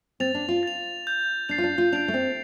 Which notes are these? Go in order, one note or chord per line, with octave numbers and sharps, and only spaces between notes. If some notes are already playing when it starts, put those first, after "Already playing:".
C4 A6 F7
D4
F4
A6 F7
G6 F7
D4 A6 C7 F7
F4
D4
F4
D4 G6 D7 F7
A3
C4